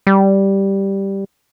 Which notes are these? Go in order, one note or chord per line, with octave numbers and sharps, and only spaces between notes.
G3